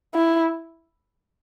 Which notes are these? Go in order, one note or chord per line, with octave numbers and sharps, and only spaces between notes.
E4